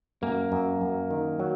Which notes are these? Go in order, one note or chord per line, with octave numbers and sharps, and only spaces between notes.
F#2 A#3
F#2
F#2
D#3
F#3